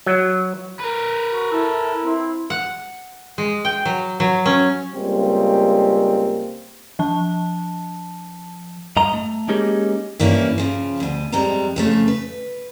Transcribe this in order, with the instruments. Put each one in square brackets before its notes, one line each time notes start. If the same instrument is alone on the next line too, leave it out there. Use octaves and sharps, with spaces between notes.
[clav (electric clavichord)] F#3
[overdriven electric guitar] A#4 B4
[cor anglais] F#4
[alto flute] E4 [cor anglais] A4
[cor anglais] C4 [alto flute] E4
[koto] F#5
G#3
G5
F#3
F#3
C#4
[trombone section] C#2 G3 A#3 C4
[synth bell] F3 A5
[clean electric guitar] G2 D#5 A#5
A3
G#3 A#3 C#4 D#4 G4 G#4
[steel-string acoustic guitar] G2 E3 A#3 C#4 E4
C#3 F3
D2 B2
F2 G3 G#3 A#5
F2 C#3 A3
B4